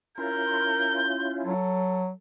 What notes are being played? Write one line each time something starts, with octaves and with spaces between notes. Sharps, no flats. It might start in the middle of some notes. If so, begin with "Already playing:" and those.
C#4 E4 F4 A#4 G6
F#3 A4